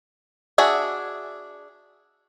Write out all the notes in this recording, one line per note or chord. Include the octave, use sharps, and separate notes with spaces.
D4 F#4 G#4 E5